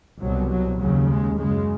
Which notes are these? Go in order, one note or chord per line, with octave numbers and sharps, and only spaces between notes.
C2 B2 F#3
F#3
D#2 C#3 F#3
G#3
F#2 C#3 G#3